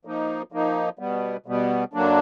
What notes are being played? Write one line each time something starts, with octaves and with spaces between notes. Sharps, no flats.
F3 A#3 D#4
F3 A#3 D#4
B2 G3 B3
B2 G3 B3
F#2 D3 F#3 A#3 D4